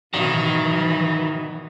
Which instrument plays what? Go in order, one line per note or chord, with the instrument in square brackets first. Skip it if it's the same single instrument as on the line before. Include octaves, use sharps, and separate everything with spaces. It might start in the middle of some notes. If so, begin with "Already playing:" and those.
[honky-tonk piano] G#1 B2 [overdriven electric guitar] D#3 [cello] E3 F#3